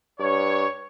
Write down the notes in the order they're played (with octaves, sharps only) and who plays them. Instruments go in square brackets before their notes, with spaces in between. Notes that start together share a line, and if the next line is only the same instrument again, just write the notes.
[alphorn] G2 [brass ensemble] C#5